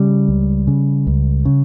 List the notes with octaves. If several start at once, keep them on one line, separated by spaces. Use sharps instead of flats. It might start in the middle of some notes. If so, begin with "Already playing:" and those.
Already playing: C#3 G3
C#2
C#3
C#2
C#3